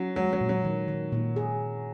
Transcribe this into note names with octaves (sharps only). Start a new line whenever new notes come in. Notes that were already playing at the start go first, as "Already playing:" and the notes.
Already playing: F#3 C#4 E4
F#3 G#3
F#3
A#2
F#3
D#3
D#3
A#2
G#4